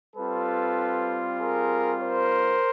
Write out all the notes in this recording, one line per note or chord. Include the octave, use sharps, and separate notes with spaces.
G3 C4 F4 A4 B4
G#4 A#4
A#4 C5